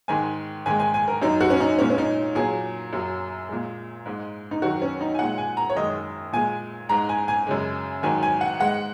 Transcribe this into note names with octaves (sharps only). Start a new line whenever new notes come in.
G#2 D#3 G#3 G#5
G#2 D#3 G#3 G#5
G#5
G#5
A#4
F#2 F#3 D#4
F#4
C#4
D#4
A#2 G#3 C#4
C#4
D#4
A#2 F#3 G#4
F#2 F#3
A#2 G#3
G#2 G#3
D#4
F#2 D#3 F#3 F#4
C#4
D#4
G#5
A#2 G#3 F#5
G#5
A#5
C#5
F#2 D#3 G#3 D#5
A#2 G#3 G#5
G#2 G#3 A#5
G#5
G#5
F#2 C#3 G#3
G#2 D#3 F#3 G#5
G#5
F#5
G#2 G#3 F#5